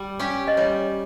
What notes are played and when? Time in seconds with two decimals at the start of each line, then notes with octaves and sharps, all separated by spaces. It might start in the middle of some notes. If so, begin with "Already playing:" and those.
Already playing: G3
0.19 C#4 G4
0.48 D#5
0.57 G3 C#5